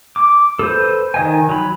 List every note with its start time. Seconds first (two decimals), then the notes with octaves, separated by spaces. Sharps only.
0.16 D6
0.59 A4 B4 C5
1.14 D#3 D#5 G#5
1.49 F#3 B5